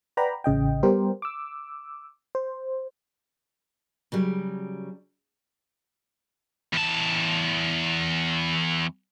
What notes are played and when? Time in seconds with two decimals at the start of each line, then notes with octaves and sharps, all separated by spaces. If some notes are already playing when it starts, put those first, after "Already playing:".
0.17 B4 D5 F#5 G5 A#5 B5
0.44 A1 C#3 D#5 G5
0.83 G3 B3 G4 A#4 C5
1.22 D6 E6
2.35 C5
4.12 C#3 F#3 G3
6.73 E2 A5